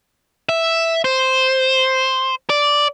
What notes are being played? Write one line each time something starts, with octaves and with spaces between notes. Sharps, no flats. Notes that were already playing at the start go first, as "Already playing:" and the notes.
E5
C5
D5